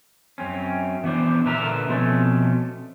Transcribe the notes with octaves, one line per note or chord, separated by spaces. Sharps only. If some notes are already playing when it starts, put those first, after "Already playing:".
F#2 C4 C#4
E3 B3 D4 C5
A#2 D3 A#4 B4 E5 A#5
B2 F3 A3 C4 C#4